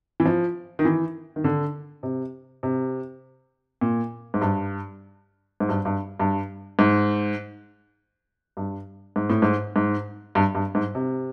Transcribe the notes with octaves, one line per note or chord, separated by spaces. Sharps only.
E3
F3
D#3
E3
D#3
D3
C3
C3
A#2
G#2
G2
G#2
G2
G2
G2
G#2
G2
G#2
A2
G#2
G#2
G2
G2
G#2
C3